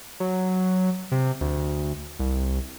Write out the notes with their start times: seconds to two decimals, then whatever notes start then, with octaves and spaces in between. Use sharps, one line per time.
0.20 F#3
1.12 C3
1.41 D2
2.19 C2